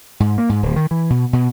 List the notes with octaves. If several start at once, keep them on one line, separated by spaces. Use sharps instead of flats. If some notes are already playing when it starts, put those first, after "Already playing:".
G#2
A#3
G#2
D1
D#3
E3
B2
B2